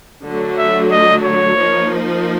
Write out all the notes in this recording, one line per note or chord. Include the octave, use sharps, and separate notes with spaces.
D3 F#3 A3
E5
D#5
C#5
F3 A#3 D#4